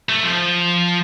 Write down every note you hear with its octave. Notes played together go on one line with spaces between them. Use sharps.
A3
F3